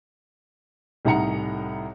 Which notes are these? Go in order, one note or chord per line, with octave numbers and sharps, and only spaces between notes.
C2 A2 D#4 F#5 A#5 C#7